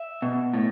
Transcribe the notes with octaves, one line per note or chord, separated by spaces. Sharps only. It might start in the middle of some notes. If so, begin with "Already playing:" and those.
Already playing: E5
B2
A2